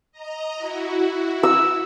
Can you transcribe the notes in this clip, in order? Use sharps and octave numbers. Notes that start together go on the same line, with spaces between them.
D#5 A#5
E4 F#4
E6